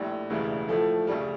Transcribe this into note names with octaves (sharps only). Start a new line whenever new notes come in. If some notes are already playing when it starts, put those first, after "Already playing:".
Already playing: A#1 A2 G3
E1 D2 C#3 E3 G3
A2 F3 A3
D2 C#3 G3